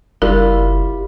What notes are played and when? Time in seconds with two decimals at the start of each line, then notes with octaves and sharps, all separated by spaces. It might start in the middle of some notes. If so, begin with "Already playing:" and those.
0.22 F#1 G3 E4 F4 A#4